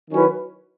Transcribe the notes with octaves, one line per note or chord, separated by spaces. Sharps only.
D#3 F#3 C#4 E4 B4